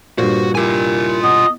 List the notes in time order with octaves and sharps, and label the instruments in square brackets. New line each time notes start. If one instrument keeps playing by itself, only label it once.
[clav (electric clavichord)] G2 A#2 [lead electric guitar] F#4 [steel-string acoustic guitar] C5 F#5
[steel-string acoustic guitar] E4 G4 A#4 [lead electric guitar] F4 G#5
[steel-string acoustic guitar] B2 [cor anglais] D#5